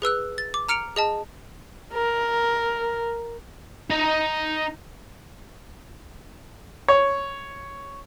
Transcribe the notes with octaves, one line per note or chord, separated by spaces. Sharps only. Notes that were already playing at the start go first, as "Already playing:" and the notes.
G#4 B4 E6 F#6
A6
D6
A#5 F6 C#7 D7 F7
G#4 D#5 A5
A#4
D#4 A#5
C#5